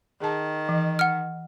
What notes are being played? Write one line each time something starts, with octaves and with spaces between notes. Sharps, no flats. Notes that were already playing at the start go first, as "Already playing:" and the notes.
D#3 G#4 A5
E3
F#5 F6